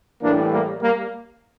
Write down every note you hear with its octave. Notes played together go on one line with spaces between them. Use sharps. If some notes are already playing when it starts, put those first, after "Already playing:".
A2 E3 G3 A#3 D4
G3 A#3
G3 A#3